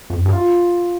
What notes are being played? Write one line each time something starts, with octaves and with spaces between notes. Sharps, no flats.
F2
F#2
G2
F4